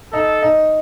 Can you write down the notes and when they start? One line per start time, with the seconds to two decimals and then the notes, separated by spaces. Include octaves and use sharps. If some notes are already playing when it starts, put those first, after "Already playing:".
0.13 D#4 A4
0.42 D#4